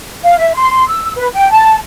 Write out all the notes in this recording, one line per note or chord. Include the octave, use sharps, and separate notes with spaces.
F5
E5
C6
E6
B4
G5
A5